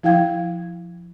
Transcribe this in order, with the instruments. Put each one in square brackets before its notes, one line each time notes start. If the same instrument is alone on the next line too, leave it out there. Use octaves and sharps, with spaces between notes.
[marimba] F3 E4 F5 G5 G#6